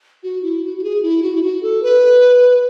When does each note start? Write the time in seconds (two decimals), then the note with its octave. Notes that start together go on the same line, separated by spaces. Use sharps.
0.23 F#4
0.43 E4
0.63 F#4
0.77 F#4
0.84 G#4
1.03 E4
1.22 F#4
1.35 E4
1.43 F#4
1.63 A4
1.83 B4